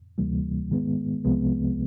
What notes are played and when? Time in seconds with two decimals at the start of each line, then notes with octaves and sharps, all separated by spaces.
0.18 D2 C3 E3 G3 A#3
0.71 G#2 D#3 G#3 B3
1.24 C2 C3 F3 G#3 B3